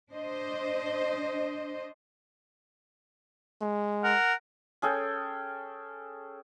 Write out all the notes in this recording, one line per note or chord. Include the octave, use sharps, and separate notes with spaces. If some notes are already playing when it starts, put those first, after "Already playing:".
D4 C5 D#5
G#3
A#4 F#5
C#4 G#4 A4 G5